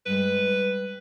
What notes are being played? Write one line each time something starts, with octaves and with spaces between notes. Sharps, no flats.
G2 G3 G#3 B4